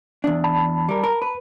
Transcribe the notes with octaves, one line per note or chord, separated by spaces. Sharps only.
E2 D4
A5 B5
G3 A#4
A#4
B4